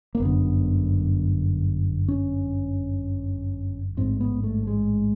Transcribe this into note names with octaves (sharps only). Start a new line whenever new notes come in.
A#3
G1 F#2 D3 B3
C#4
A1 G#2 C4
B3
A3
G#3